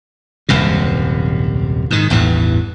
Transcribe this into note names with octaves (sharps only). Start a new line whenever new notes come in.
D#1 C2 F#2 C3
G#2 D#3
A1 E2 G2 E3